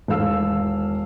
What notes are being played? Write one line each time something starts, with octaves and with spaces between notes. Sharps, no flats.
E1 D#3 A4 F5 E6